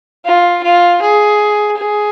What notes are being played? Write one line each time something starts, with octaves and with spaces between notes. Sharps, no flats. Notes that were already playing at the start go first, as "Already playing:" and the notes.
F4
F4
G#4
G#4